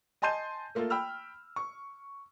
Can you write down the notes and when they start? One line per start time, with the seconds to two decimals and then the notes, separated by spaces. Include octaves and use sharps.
0.22 D#5 G#5 A5 C6 G6 D#7
0.75 A3 A#3 F4 A4
0.90 G5 B5 E6 F6
1.56 C#6